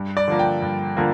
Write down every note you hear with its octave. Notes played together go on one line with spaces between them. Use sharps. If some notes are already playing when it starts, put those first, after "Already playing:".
Already playing: G2
D5
D3 F3 A#3
G5
G2
D3 F3 A#3